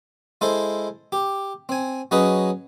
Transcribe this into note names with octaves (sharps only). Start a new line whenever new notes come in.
G#3 E4 A4 C5
G4
C4 G#5
F#3 C#4 G#4 B4 D#5